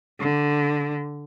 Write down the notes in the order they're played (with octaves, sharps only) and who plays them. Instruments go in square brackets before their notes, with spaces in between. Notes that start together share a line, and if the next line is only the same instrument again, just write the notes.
[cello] D3